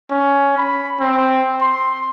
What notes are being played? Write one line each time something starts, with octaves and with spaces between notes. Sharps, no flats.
C#4
B5
C4
C6